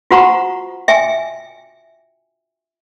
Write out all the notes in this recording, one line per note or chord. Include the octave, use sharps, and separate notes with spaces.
F4 F#4 C5 F#5 A#5 C#6
E5 G5 G#5